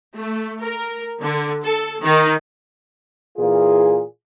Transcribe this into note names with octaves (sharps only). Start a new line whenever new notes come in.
A3
A#4
D3
A4
D#3
A#2 E3 F4 G#4